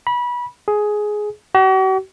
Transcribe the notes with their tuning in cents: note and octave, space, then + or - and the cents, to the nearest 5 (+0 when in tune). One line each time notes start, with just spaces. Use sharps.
B5 -25
G#4 +10
F#4 +45